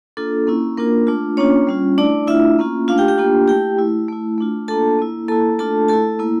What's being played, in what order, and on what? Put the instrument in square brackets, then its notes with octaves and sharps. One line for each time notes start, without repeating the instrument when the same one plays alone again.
[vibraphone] A#3 D4 F4 A4
A#3 C#4 E4
A#3 D4 F4 A#4
A3 D4 F4
A#3 C#4 D4 F4 C#5
G3 C#4 F4
A3 D4 E4 D5
A3 D4 E4 F4 E5
A#3 C#4 F4
A3 D4 F4 F5
G4 G5
G4 G5
A#3 D4 F4
A3 E4 G4 G5
A3 E4
A3 E4
A3 D4 F4
A#3 D4 F4 A4 A5
A#3 E4
A#3 E4 A4 A5
A3 D4 F4 A4 A5
A3 E4 A4 A5
A#3 E4